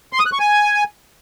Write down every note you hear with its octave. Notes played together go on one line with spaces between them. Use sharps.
C6
D#6
F#6
C#6
G#5